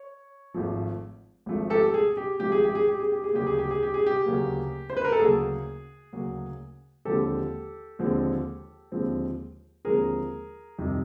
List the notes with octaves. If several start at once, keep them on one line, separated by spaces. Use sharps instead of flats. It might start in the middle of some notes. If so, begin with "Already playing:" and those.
Already playing: C#5
G#1 G#2 F3 A3
G#1 G#2 F3 A3
G4 A4
G#4
G4
G#1 G#2 F3 A3 G4
G#4
G4
G#4
G4
G#4
G4
G#4
D2 C#3 F#3 A#3 G4
G#4
G4
G#4
G4
G#4
G4
D2 C#3 F#3 A#3
C5
B4
A#4
A4
D2 C#3 F#3 A#3 G#4
D2 C#3 F#3 A#3
D#2 D3 F3 G#3 C4 G4 A4
D#2 D3 F3 G#3 C4
D#2 D3 F3 G#3 C4
D#2 D3 F3 G#3 C4 G#4 A#4
F2 C3 D#3 G3